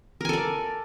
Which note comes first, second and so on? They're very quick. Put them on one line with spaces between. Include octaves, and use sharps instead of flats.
A#4 G#5 A4 D5